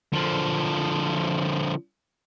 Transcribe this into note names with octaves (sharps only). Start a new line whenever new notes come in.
D3 F3